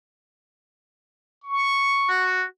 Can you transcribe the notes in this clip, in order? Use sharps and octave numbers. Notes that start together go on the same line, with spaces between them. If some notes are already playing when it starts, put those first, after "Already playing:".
C#6
F#4